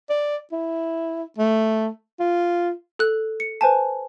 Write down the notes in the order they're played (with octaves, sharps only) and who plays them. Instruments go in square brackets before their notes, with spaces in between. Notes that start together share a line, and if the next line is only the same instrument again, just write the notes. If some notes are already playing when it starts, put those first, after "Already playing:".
[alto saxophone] D5
E4
A3
F4
[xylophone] A4 F#6
C#7
B4 C5 G#5 A5